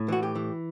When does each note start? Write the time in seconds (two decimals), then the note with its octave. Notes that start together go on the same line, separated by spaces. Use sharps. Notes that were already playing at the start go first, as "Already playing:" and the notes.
Already playing: A2
0.08 E3 F#4
0.23 G4
0.35 E3